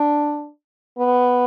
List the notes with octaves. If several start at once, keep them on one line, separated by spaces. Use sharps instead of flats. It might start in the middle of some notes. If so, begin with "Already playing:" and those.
Already playing: D4
B3